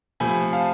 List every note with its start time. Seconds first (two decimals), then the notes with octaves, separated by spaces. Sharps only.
0.20 C3 F3 A3 G#5 B5
0.52 F5 A5